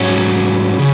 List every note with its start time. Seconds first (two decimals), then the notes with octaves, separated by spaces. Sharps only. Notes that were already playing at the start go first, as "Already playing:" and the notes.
Already playing: G#2 F#3 C#4
0.79 C#3